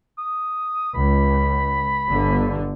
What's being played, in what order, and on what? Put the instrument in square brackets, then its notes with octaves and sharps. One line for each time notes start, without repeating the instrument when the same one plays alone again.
[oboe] D#6
[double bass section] C#2 [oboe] B5
[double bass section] G1 D3